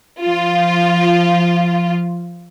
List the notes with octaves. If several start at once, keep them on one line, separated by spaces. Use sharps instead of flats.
F3 F4